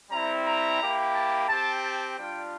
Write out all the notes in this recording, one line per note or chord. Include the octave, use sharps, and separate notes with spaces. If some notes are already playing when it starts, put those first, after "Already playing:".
G3 C4 E4 A#5
A#5
A#3 E4 G4
A5
C4 G4 A5
A5
G3 D4 F4 G5